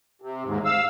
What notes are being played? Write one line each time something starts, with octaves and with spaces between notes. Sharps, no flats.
C3
D#2 G#2
F5 E6